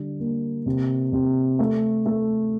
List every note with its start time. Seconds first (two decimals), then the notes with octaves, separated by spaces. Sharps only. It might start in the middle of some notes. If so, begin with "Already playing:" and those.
Already playing: D3 G3
0.19 A#3
0.66 C3
1.12 C3
1.59 A3
2.06 A3